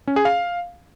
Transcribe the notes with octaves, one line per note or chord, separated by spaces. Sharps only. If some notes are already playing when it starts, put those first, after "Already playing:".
C#4
G#4
F5